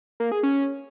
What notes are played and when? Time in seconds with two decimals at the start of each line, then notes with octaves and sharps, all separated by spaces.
0.20 A#3
0.32 G#4
0.43 C#4